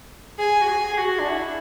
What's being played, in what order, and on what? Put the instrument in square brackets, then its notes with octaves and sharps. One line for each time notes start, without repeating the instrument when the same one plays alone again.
[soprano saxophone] G#4 [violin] G#5
[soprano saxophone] F#4
G#4
G#4
F#4
D4
E4